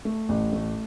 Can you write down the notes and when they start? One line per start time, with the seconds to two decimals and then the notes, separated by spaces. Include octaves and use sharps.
0.05 A3
0.29 A1
0.53 A3